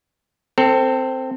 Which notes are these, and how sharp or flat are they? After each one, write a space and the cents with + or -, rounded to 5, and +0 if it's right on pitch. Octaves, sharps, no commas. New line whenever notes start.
C4 +0 A4 +25